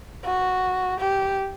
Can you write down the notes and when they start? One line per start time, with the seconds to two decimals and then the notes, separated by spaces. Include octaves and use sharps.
0.24 F#4
1.00 G4